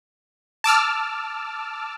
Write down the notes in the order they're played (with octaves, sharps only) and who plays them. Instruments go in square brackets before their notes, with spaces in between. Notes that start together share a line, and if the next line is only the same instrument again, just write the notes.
[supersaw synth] A5 D6 E6 F6